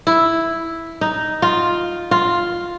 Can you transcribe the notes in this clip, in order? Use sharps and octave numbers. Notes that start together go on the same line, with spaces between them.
E4
D#4
F4
F4